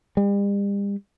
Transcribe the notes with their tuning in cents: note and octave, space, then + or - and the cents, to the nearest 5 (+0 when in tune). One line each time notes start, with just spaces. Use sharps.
G3 +40